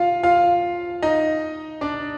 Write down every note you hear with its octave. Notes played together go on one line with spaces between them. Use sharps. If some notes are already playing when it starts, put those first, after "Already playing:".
Already playing: F4 F5
F4 F5
D#4 D#5
D4 D5